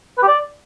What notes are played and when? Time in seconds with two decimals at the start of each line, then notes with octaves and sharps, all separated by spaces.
0.18 B4
0.23 G4
0.28 D5